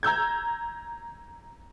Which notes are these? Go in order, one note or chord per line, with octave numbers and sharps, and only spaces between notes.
A#5 E6 G6 G#6